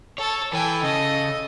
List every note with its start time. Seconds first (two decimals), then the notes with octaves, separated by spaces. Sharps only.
0.18 A4 C#5 A5
0.53 E3 A4 G5 G#5
0.83 C#3 D#5